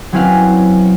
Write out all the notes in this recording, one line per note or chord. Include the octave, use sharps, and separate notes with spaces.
F#3 C4 C#4 E4 B4 F5